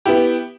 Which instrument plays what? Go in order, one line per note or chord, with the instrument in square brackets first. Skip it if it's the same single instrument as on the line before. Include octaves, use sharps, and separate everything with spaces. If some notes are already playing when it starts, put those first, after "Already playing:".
[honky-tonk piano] B3 E4 G4